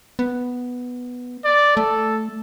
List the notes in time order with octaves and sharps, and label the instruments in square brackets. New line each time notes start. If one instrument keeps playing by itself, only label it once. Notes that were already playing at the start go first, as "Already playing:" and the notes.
[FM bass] B3
[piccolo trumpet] D5
[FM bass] A3 [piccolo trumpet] A4